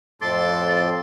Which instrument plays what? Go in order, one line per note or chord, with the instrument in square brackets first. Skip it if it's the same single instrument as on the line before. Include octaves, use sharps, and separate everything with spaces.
[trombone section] F2 A2 [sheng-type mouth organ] A4 C6 D6 [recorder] A6